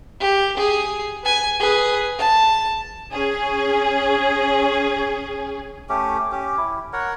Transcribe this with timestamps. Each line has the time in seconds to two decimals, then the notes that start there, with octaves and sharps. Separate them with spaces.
0.20 G4
0.57 G#4
1.23 B4 G#5
1.60 G#4 B4
2.18 A5
3.12 C#4 G#4
5.89 A3 C#4 G4
6.32 C#4 G4
6.58 E4
6.93 A#4 C#5 F#5